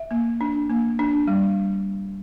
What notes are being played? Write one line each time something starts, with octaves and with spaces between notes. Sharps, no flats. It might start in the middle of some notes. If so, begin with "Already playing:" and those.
Already playing: E5
A#3
D4
A#3
D4
G3